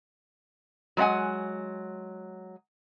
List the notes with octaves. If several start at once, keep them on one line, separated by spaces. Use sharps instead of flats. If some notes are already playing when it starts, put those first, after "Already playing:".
F#3 G#3 D5 F#5 G#5